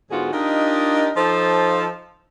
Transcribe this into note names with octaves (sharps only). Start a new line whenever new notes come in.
G#2 D3 B3 F4 F#4 G#4
D4 D#4 F4 G4 A#4 D#5
F3 D#4 F4 A4 C5